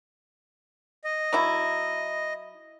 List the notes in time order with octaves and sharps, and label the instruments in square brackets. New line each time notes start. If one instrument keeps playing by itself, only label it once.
[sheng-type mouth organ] D#5
[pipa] F#3 E4